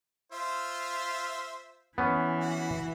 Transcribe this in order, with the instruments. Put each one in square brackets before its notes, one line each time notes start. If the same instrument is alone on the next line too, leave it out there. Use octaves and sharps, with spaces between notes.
[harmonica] F4 C5 E5
[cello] E3 [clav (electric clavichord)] B3 C#4
[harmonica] F#4